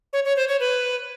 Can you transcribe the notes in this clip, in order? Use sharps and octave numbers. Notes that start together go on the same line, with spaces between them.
C#5
C#5
C5
C#5
B4